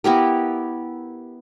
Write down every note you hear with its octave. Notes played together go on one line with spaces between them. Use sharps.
B3 E4 G4 A#4